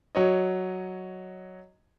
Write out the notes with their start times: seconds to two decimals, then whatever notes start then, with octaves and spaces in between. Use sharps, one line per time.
0.15 F#3 C#5 D#5